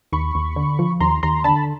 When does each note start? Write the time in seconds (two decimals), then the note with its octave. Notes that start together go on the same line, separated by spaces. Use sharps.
0.12 D#2 B5 C#6
0.35 D#2
0.56 D3
0.79 F3
1.00 D#2 A#5 C6
1.23 D#2 A#5 C6
1.44 D3 A5 B5